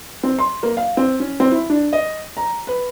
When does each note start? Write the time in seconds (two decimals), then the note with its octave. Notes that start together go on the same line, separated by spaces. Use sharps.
0.23 C4
0.39 C6
0.63 A#3
0.77 F5
0.97 C4
1.20 C#4
1.40 C4
1.52 E4
1.70 D4
1.93 D#5
2.37 A#5
2.67 B4